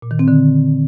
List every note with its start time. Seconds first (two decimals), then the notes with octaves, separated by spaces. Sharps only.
0.02 A#2
0.11 D#3
0.19 C4
0.28 D3